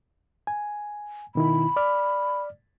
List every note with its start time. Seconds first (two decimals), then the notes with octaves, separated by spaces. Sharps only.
0.47 G#5
1.35 B2 D#3 E4 B5
1.76 D5 F6